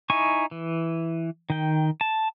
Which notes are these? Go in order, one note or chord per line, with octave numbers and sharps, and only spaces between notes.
D#4 E4 G#5 C#6
E3
D#3 G5
A5